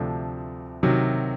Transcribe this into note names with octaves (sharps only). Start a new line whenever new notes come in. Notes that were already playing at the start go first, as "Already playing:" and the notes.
Already playing: D2 C3 F3 A3 D4
C3 D#3 F#3